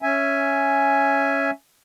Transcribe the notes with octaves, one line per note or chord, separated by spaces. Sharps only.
C#4 E5 G#5